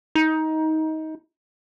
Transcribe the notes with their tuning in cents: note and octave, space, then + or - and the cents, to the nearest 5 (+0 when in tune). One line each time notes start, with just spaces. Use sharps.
D#4 +20